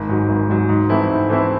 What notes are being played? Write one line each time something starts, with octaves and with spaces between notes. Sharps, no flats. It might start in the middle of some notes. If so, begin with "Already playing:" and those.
Already playing: G#1
G#2 F#3
G#1
G#2 F#3
G#2
E3 A3 C4 E4
G#2
E3 A3 C4 E4